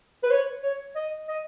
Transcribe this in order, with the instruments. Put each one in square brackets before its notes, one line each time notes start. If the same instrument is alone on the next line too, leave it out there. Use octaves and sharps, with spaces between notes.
[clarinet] B4
C#5
C#5
D#5
D#5